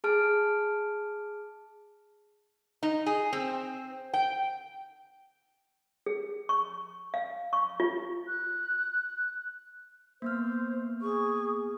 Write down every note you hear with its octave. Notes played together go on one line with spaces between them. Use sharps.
G#4 A5 F6 D7
D#4
G#4
C4
G5
G#4
C#6
F5
C#6
F4
F#6
A#3 B3 C5 F6
G#4 C#6